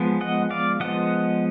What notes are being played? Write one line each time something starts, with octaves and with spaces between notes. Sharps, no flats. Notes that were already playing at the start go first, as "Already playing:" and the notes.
Already playing: F3 G#3 B3
D#5 F#5
D5 F5
F3 G#3 B3 D#5 F#5